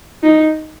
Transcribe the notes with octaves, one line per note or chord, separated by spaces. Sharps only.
D#4